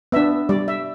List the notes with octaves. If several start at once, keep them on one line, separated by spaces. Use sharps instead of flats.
B3 D4 E5
G3 D5
E5